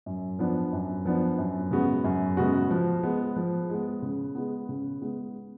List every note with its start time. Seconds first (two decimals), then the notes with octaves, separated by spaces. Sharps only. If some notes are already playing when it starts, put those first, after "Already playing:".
0.06 F#2
0.39 F3 B3 D4
0.73 F#2
1.05 F3 B3 D4
1.39 F#2
1.71 C#3 G#3 B3 F#4
2.04 F#2
2.37 C#3 G#3 B3 F#4
2.71 F3
3.03 G#3 B3
3.36 F3
3.70 G#3 B3
4.02 C#3
4.35 G#3 B3
4.69 C#3
5.02 G#3 B3